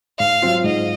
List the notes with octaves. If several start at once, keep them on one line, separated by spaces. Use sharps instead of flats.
G#2 F5
F#3 C4 F4
G#2 D#5